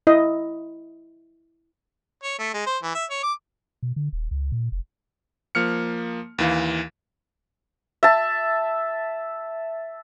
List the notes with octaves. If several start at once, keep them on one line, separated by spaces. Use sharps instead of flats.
E4 D#5
C#5
A3
G#3
C5
E3
E5
C#5
D6
B2
D3
D#1
C#2
A#2
F1
F3 A#3 F6 C#7
D#2 E3 F5
E5 A5